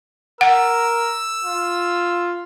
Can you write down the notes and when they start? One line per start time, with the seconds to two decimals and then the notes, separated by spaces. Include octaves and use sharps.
0.41 A#4 F#5 E6
1.44 F4